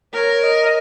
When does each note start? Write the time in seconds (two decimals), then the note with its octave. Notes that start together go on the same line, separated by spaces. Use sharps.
0.14 A#4 C#5
0.43 D#5
0.65 D#5